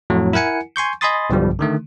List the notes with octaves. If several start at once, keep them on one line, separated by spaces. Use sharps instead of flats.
F2 A2 F#3
E4 A#4 F#5 G#5 C#7
G#5 C6 C#6 G6
D#5 G#5 B5 C6 D#6 A6
B1 G2 B2 D3 F3 G3
D3 D#3 A3